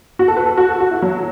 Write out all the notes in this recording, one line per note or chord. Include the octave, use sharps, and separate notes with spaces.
F#4
A4
B4
A4
F#4
A4
F#4
E4
F#3